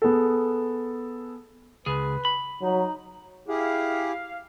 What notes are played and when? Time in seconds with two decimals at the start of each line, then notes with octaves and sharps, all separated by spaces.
0.02 B3 G#4 A4
1.86 C#2 G#4 B4
2.25 B5
2.62 F#3 D#4
3.48 E4 G4 G#4 F5